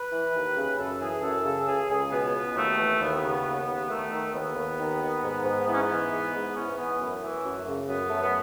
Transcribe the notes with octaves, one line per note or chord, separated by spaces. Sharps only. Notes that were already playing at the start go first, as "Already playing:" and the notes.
Already playing: B4
E3
D#2
C#3
F#2 A4
E3 G#4
F#2 A4
C#3 A4
C#2 G#4
C#2 G#4
B2 B3
B2
D#2 A3
E3
D#2 B3
B3
C#3
B3
D#2
D#2
D#3 A3
D#3
D#2 B3
D#2
D#3
D#3
G#2
G#2
E3 B3
C#4
B3
E3
G#2
G#2
E3 C#4
E3 B3
F#2 A3
E3
F#2
C#3
F#2 B3
F#2 A3
B3